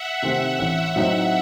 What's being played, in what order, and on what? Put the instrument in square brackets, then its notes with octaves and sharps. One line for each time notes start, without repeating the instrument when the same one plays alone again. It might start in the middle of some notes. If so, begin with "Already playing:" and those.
Already playing: [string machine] E5 F#5
[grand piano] C3 D#3 A3 C4
A1
A2 F#3 C4 D#4